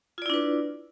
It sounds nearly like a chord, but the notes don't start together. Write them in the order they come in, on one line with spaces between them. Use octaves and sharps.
F4 D5 E4 D4 B4